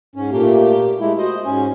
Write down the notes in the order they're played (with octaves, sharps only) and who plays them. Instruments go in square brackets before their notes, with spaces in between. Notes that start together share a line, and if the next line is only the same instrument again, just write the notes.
[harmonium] G#2 C#4
[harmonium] A#2 A3 A#3 [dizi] G4
[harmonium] G#3 A3 E4
[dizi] F#4 [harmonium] C5 D#5
[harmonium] G#2 C#4 [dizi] G#5